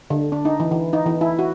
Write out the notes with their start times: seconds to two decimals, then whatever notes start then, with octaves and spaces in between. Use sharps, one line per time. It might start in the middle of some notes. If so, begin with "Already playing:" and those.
0.10 D3
0.32 D4
0.45 D#4
0.60 E3
0.72 E3
0.93 D#4
1.06 E3
1.21 E4
1.39 F#4